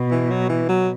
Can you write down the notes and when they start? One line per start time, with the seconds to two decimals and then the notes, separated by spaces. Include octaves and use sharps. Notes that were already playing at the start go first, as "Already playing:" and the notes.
Already playing: B2
0.11 E3
0.30 F#3
0.49 E3
0.69 F#3